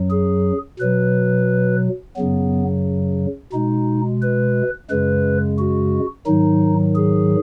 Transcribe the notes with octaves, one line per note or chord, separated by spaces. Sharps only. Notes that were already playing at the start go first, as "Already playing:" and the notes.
Already playing: F#2 F#3
G#4
B2 F#3 B4
F#2 C#3 F#3 B3
B2 G#3 D#4
B4
F#2 C#3 G#3 B4
F#4
G#2 D#3 F#3 D#4
G#4